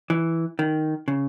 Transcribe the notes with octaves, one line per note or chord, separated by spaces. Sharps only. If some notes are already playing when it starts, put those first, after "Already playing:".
E3
D#3
C#3